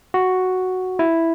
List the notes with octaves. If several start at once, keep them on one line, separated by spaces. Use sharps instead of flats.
F#4
E4